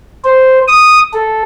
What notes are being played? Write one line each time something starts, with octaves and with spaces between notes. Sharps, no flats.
C5
D#6
A4